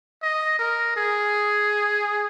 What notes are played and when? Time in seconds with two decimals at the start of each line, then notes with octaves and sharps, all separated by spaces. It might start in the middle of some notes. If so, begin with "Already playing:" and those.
0.22 D#5
0.59 A#4
0.96 G#4